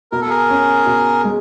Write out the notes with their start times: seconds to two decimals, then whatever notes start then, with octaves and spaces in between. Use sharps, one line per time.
0.12 B2 A#4
0.21 A4
0.30 G#4 A#4
0.50 C#4
0.86 B2
1.24 G#3